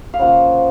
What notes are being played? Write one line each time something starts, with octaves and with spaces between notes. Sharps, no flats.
F5
C#3 F3 A#3 F#5